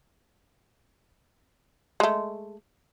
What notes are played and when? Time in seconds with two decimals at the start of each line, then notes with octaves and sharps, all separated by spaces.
2.00 G#3 A3